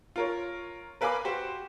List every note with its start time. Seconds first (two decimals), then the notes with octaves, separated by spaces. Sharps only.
0.16 F4 A#4 C#5
1.01 A#4 B4 F5 G#5 B5 D6
1.25 F#4 G4 C5